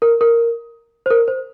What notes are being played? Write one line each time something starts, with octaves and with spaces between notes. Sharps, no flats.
A#4
A#4
C5
A#4
C5